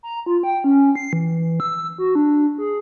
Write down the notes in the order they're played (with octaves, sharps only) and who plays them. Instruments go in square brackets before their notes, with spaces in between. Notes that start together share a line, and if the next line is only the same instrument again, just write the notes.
[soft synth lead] A#5
F4
G5
C#4
C7
E3
E6
F#4
D4
G#4